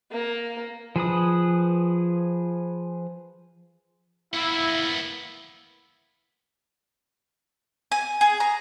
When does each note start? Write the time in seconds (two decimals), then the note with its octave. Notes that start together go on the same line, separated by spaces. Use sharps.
0.11 A#3
0.96 F3 G#4 B4 D#6
4.34 A#3 B3 E4
7.92 G#5
8.21 G#4
8.40 A#5